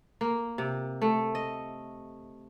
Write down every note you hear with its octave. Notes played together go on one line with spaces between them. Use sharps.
A#3
C3
A3
D#5